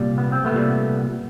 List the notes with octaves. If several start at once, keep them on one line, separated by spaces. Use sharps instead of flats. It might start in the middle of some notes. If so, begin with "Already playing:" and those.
Already playing: C2 A#2 G3
B3
C4
A3 B3
C2 A#2 G3